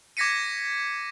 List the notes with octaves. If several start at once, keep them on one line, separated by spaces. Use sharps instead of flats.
D6 G#6 A#6 B6 C#7 D#7